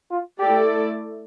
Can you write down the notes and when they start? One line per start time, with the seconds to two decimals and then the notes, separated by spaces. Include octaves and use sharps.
0.11 F4
0.40 A3 E4 G4 A4 D5